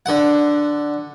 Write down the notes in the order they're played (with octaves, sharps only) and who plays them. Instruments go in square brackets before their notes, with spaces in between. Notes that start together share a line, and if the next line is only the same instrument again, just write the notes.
[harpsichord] D3 F#5